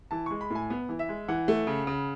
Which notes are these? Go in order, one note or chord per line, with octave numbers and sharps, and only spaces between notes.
E3 A5
G#3 C#6
B5
A2 G#5
B3
E3
E5
G#3
E3 F#5
A3
C#3
C#3